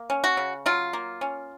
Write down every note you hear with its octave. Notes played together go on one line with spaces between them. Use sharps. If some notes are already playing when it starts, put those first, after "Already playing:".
Already playing: A#3
C#4
F#4
C#3
F#3 F4
A#3
C#4